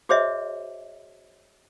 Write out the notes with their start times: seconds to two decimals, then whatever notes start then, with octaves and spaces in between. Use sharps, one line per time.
0.09 F#4 G#4 C5 C#5 D#5 E5